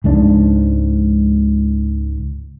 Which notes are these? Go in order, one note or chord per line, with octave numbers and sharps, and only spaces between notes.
C#2 G#2 D4